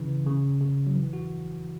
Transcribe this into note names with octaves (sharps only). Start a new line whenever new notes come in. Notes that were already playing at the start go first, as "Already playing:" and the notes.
Already playing: C#3 E3
C#3
C#3
F#3
E3
F#4